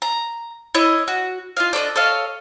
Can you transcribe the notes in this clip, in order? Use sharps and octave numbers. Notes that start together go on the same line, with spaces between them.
A#5
E4 C#5 D#5
F#4
F4 D#5 F5
D4 A4 C#5 D#5
A4 C#5 D#5 F5